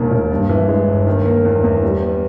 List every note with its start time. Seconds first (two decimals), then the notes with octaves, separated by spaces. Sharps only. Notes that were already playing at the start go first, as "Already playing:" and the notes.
Already playing: E1 D#2 D#3 A#3
0.11 E1
0.31 G2
0.49 E3
0.69 G#3
0.87 G1
1.07 D#3
1.26 A#3
1.44 E2
1.64 E2
1.83 G3
2.01 B3